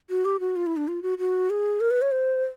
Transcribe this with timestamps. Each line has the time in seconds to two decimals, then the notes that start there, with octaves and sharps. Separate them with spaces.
0.10 F#4
0.25 G4
0.40 F#4
0.56 F4
0.67 E4
0.77 D4
0.88 F4
1.03 F#4
1.18 F#4
1.50 G#4
1.81 A#4
1.91 B4
2.02 C#5
2.12 C5